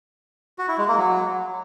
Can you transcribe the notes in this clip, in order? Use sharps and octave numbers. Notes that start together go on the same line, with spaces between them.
F#4
E4
G#3
A#3
F#3